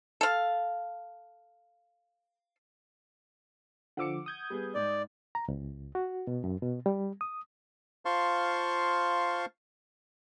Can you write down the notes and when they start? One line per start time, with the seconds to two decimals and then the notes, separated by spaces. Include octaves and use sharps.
0.21 A4 F5
3.97 D3 F3 F#5 D6 E6 C#7
4.26 D#6 G6 G#6
4.50 G3 B3 G#4
4.75 G#2 G#3 D5
5.35 A#5
5.48 C#2
5.95 F#4
6.27 B2
6.44 F#2
6.62 B2
6.86 G3
7.21 D#6
8.05 F4 C5 F5 A5 C6 C#6